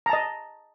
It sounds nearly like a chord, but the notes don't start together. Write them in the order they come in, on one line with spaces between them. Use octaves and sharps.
A#5 A5 D#5